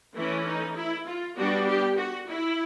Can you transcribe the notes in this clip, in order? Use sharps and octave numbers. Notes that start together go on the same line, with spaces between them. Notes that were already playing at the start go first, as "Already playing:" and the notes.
E3 A3 C#4 E4
D#4
E4
F4
G3 B3 D4 F#4
G4
F#4
E4